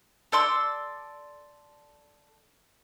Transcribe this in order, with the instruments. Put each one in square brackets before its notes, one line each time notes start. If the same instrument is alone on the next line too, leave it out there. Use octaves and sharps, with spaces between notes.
[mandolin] A4 D5 C6 E6